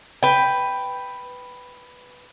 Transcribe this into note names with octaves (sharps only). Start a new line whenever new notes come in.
B4 G5